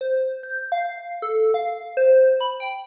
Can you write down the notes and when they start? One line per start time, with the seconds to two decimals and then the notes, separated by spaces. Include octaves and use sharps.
0.01 C5
0.43 G6
0.72 F5
1.22 A4
1.54 F5
1.97 C5
2.41 B5
2.60 G5